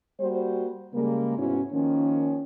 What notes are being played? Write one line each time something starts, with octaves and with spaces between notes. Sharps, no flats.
G3 A#3 F#4 C5
C#3 G3 G#3 A#3
G#2 C3 B3 C#4 E4 F#4
D#3 F3 A#3 C#4